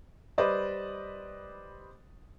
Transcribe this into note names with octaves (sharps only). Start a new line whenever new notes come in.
G3 B4 C5 D5 D#5